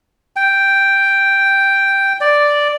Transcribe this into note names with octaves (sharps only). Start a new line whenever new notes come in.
G5
D5